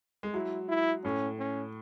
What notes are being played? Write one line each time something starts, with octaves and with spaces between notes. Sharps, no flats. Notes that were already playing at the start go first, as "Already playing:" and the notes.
G#3
F#3 E4
E4
A2 C#4
C#4